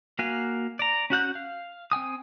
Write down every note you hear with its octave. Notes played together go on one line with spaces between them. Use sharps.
A#3 F#4 F5 G#5
D5 A#5
C#4 F#4 F#5 G6
F5
C4 G5 G#5 D#6